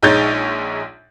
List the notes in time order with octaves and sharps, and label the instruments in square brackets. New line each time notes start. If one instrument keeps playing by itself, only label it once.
[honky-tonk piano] A#1 G#3 D#4 C#5 G6 A6